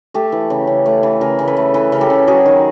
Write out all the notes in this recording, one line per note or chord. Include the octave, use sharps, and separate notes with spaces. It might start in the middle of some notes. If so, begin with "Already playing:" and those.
A3 G4 A4
E3
C#3
C#3
A3
E3
C#3 G#4 A#4
C#3
A4 B4
A3
E3 A4 B4
C#3 A#4
G4 A4
C#3
F#3 F#4 G#4
D#3